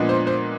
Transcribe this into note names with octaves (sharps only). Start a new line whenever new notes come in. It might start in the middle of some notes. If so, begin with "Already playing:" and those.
Already playing: A#2 F3 G#3 B3 D4
C5
C5